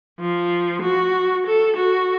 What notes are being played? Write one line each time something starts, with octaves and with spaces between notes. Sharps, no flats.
F3
F#4
A4
F#4